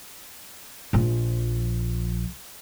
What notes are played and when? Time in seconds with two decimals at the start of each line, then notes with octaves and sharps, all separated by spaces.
0.93 A#1 F3